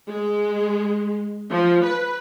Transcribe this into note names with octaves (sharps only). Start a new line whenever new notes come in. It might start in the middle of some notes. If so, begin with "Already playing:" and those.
G#3
F3
B4